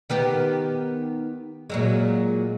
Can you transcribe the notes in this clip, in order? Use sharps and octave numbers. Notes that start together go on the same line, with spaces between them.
D#3 B3 G4
A#2 F#3 G#3